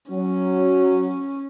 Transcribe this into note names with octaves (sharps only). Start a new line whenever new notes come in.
F#3 C#4